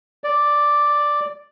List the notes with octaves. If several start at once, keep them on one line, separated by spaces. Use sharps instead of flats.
D5